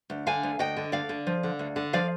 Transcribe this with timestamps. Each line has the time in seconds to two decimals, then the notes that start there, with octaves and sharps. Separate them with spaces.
0.10 D2
0.27 D3 F5 G#5
0.43 D2
0.59 D2 D#5 G5
0.77 D3
0.92 D2 D5 F5
1.09 D3
1.27 F3
1.43 D3
1.59 D2
1.76 D3
1.93 F3 D5 F5